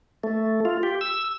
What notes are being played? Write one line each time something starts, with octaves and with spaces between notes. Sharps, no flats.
A3
F4
G4
E6